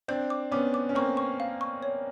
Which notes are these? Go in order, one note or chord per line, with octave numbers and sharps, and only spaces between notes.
C4 D4 G6
D6
B3 C#4 D6
D6
C#4
A#3 C4 C#6
C#6
F5
C#6
C#5